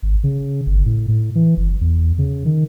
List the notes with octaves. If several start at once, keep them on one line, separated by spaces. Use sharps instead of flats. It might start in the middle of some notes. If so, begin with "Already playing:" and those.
G#1
C#3
G1
A2
A2
E3
F#1
E2
C#3
D#3